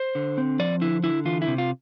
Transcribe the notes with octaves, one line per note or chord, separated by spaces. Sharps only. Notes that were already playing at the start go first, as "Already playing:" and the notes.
Already playing: C5
D3
C4
F3 D5
D3 E4
D3 E4
E3 F4
E4
C3
F4